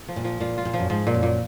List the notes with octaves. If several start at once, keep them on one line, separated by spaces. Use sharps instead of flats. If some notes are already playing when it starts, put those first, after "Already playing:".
F3
A#2
F3
A#2 F4
F4
A#2
F3
F#2
G#2 F3
A#2
F#2
A#2